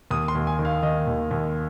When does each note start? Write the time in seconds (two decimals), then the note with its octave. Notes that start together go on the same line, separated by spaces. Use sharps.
0.11 D#2 D#6
0.28 C6
0.35 D#2
0.47 G#5
0.59 D#3
0.65 F5
0.83 D#3 D#5
1.07 D#2
1.31 D#2